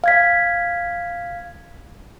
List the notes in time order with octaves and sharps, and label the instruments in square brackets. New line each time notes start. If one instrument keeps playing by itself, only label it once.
[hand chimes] F5 G#6 B6